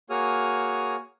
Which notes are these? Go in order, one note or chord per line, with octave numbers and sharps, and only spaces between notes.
A#3 F#4 G#4 C#5 D#6 F6